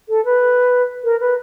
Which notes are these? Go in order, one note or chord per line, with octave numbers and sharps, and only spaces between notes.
A4
B4
A#4
B4